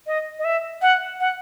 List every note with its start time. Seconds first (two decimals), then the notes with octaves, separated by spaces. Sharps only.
0.07 D#5
0.39 D#5
0.45 E5
0.82 F#5
1.20 F#5